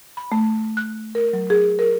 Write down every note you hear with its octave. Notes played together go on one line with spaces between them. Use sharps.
B5
A3
F#6
A#4
F#3
G#4
A#4